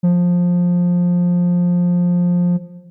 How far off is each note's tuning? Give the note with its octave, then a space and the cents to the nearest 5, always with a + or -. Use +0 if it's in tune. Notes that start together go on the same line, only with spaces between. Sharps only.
F3 +15